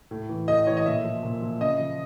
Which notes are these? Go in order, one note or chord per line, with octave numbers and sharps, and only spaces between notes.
A2
E3
A2 D#5
E3 C#5
D#5
A#2 E5
F3
A#2
F3
C#3 D#5
F3